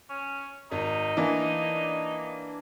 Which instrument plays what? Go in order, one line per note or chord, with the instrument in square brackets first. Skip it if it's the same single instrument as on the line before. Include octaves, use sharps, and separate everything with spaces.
[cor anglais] C#4
[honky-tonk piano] G#1 [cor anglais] D#4
[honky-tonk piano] E3 A#3 D4